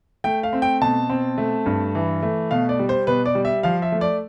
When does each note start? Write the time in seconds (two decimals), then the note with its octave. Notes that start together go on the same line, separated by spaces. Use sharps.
0.24 A3 G5
0.43 F5
0.53 C4
0.62 G5
0.81 B2 A5
1.10 C4
1.38 A3
1.66 G2
1.95 E3
2.23 A3
2.51 B2 F5
2.69 D5
2.79 G3
2.89 C5
3.07 B2 B4
3.26 D5
3.35 G3
3.45 E5
3.63 F3 F5
3.82 E5
3.92 A3
4.01 D5